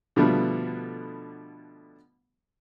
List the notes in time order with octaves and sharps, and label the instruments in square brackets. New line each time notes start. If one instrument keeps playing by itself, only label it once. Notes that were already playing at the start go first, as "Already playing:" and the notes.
[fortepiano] B2 D3 F3 G3 A3 B3